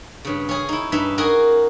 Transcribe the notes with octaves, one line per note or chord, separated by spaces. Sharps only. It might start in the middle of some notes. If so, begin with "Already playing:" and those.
G2 C#3
C#4 G#4
D#4 E4
G2 D#4 E5
D#4 F#4 G#4 A#4